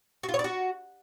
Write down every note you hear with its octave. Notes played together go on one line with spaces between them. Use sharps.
F#4
F4
C#5
D5
F#4